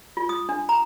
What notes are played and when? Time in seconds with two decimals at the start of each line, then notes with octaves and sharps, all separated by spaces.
0.17 F4
0.29 D#6
0.49 D4
0.69 A#5